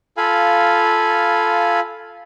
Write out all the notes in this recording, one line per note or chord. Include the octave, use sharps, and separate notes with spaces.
F4 A4 F5 G#5 B5